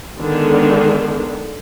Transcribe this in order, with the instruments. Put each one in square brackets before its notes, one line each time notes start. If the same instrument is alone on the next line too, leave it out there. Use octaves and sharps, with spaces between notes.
[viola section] D3 D#3 G#3 B3 D4